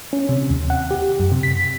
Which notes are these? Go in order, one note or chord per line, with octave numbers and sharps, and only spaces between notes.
C#4
C3
D#2
F#5
G4
F#2
C3
B6